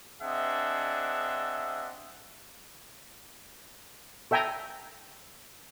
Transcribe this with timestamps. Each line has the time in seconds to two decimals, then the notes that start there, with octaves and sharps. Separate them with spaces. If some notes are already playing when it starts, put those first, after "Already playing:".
0.22 C4 D4 G#4 D#5 E5 F#5
4.31 A4 E5 G5 G#5 A#5